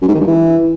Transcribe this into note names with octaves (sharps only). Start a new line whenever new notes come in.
F#2
G#2
D#3
G2
E3